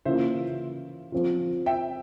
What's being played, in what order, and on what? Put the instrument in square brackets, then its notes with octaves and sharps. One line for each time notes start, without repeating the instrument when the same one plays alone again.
[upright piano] C#3 E3 A#3 F4 [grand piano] C5 E5
[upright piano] F3 C4 F4
[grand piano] E5 G5